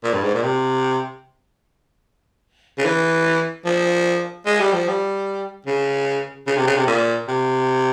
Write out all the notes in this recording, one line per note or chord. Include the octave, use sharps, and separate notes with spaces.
A#2
G2
G#2
A#2
C3
C#3
E3
F3
G#3
G3
F3
G3
C#3
C#3
C3
C#3
C3
A#2
C3